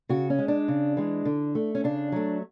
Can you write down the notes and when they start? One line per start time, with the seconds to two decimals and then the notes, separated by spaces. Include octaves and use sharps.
0.09 C#3 F#4
0.30 C#4
0.39 G#3
0.48 D4
0.68 C#3
0.97 E3 G#3
1.25 D3
1.55 A3
1.75 C#4
1.84 C#3 D4
2.12 F#3 A3